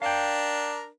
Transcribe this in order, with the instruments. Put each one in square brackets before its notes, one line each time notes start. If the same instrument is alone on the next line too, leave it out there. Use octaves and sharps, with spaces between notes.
[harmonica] D4 A#4 [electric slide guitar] F5 G5